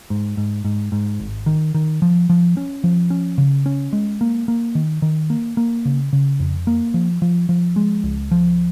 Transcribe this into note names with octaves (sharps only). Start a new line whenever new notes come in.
G#2
G#2
G#2
G#2
G#1
D#3
D#3
F3
F3
C#4
F3
C#4
C#3
C#4
G#3
A#3
A#3
D#3
D#3
A#3
A#3
C#3
C#3
F2
A#3
F3
F3
F3
G#3
C#2
F3